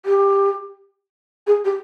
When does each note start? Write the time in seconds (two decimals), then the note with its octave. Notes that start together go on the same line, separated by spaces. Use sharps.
0.06 G4
1.47 G#4
1.65 G4